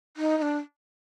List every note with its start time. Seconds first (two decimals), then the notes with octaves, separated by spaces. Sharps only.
0.17 D#4
0.37 D#4
0.42 D4